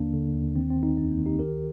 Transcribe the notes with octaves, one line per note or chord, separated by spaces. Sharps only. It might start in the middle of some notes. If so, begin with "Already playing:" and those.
Already playing: D#2 D3 A#3 D4
D3
D#2
D#3 C4
C4
D#3
C4 D#4
F2 C4
A#3
D#3
D#4 G4
D2 G4 A#4